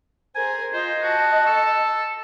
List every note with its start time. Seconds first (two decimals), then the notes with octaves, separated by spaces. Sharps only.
0.36 G#4 A#4 C5 G#5
0.74 F4 C5 D#5
1.03 F#4 A5
1.46 A4